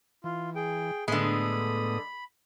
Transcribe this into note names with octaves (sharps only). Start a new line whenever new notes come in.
E3 F4
G#4 G5
A2 D3 G#3 B3 B5 D#6